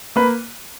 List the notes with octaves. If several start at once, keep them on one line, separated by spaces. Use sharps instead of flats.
A#3 B4